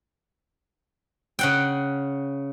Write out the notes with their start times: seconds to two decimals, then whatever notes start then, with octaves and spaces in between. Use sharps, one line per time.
1.39 C#3 F#5 G5